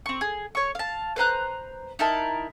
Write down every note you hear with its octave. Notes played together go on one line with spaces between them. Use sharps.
C4 C#6
G#4
C#5 C#6
F5 A5
B4 C5 A#5 F#6
D#4 E4 A#4 A5